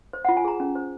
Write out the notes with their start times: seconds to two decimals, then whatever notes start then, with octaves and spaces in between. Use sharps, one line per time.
0.13 C5
0.25 F4 F#5
0.37 G#5
0.45 G#4 A#5
0.60 C#4
0.75 C5